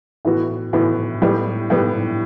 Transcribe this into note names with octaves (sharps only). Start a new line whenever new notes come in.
A2 E3 B3 F#4
A2 E3 B3 F#4
A2 G3 B3
A2 G3 B3